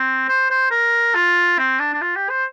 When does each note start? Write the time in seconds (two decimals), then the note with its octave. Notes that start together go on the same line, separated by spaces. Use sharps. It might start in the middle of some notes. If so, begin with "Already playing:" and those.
Already playing: C4
0.28 C5
0.50 C5
0.71 A#4
1.14 F4
1.58 C4
1.80 D4
1.93 D4
2.01 F4
2.16 G4
2.29 C5